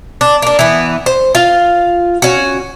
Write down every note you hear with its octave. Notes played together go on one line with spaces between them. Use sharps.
D4
A#3 D4
E3 B3
C5
F4 F5
C#4 F#4